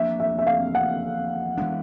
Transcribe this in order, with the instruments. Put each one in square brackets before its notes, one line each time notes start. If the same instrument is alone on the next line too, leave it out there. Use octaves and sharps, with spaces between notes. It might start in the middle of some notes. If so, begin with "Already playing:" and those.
Already playing: [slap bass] F3 A#3 D4 [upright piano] E5
[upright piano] E5
E5
F5
F#5
[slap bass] E3 G#3 B3 D4